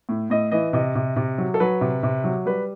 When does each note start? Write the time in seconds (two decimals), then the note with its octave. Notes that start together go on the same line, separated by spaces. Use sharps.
0.09 A2
0.30 A2 D#5
0.52 E3 D#5
0.73 C3 D#5
0.95 C3
1.16 C3
1.38 F#3
1.54 A4
1.60 F#3 B4
1.81 C3
2.03 C3
2.24 F#3
2.46 G3 B4